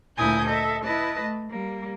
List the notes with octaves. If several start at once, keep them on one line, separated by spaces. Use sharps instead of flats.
D2 A#2 E4 G#5 D#6 G6
A4 D#5 E5
E4 B4 D#5 A5
A3
G3 A#3